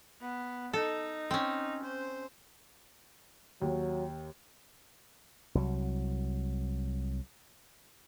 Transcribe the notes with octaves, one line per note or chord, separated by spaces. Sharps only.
B3
D#4 A4
C4 C#4
C5
D#2 F#3
C2 F#3